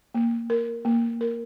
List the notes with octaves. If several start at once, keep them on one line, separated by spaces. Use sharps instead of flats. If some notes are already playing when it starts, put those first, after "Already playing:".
A#3
A#4
A#3
A#4